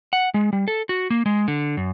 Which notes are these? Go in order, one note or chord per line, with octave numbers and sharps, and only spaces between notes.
F#5
G#3
G3
A4
F#4
A#3
G#3
D3
F#2